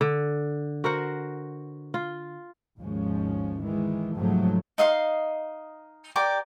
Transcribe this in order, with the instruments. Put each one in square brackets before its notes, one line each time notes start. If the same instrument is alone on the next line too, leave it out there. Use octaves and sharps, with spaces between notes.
[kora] D3
F#4 A#4 C5 F#5
F4
[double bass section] G#1 D#2 F3 G#3 C#4
D#3 E3 G#3
G#2 C3 F3 F#3 G#3 A3
[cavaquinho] D#4 D#5 F5 C6
G4 A#4 D5 D6